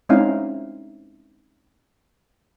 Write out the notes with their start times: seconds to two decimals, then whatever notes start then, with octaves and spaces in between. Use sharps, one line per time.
0.09 G#3 C4 C#4 D#4 E4 F5